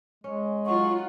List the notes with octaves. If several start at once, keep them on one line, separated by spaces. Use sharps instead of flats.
G#3 C#4
F#3 D#4 F4 F#5 C#6